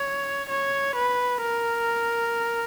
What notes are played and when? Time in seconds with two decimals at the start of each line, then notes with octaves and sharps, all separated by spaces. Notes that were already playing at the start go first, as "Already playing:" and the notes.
Already playing: C#5
0.49 C#5
0.96 B4
1.42 A#4